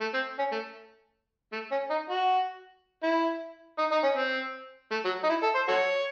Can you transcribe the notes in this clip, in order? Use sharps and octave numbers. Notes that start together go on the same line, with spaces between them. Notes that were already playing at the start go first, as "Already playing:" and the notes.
A3
C4
C#4
A3
A3
C#4
D#4
F#4
E4
D#4
D#4
C#4
C4
A3
F#3
D#4
E4
A4
C5
F#4 A4 C#5